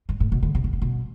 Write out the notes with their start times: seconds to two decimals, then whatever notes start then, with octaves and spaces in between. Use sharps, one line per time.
0.09 G2
0.20 A2
0.32 B2
0.43 D3
0.55 C3
0.64 B2
0.73 A2
0.82 B2